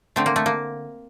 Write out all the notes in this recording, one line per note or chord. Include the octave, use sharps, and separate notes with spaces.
D3 A3 C4
A#3
A3
A#3